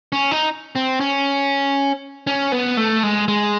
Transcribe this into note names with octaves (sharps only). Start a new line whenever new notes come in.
C#4
D#4
C4
C#4
C#4
B3
A3
G#3
G#3